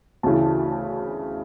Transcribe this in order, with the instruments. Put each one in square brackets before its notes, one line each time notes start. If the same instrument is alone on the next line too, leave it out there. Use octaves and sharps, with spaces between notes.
[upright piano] D2 C#3 E3 A5